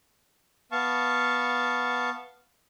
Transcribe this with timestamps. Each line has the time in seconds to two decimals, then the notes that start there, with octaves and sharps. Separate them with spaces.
0.72 B3 F5 A5 C#6